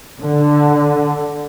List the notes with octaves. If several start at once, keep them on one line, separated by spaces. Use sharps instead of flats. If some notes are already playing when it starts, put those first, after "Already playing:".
D3